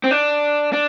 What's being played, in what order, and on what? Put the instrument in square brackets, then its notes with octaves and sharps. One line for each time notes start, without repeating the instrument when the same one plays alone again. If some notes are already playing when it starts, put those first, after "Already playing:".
[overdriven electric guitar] C4
D4
D4